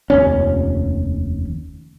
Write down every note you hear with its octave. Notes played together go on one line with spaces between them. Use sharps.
F1 D#2 C#4